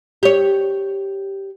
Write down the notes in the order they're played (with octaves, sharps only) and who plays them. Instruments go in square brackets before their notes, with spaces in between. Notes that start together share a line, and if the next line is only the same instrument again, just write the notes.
[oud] G4 C#5